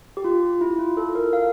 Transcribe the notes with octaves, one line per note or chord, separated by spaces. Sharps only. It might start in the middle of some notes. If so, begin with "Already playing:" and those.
G4
F4
E4
F4
A4
A#4
F5